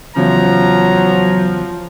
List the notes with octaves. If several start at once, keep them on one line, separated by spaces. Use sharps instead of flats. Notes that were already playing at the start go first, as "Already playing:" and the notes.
E2 C#3 F3 F#3 A#5